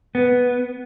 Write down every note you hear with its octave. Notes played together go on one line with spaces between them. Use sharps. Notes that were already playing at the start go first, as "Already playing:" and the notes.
B3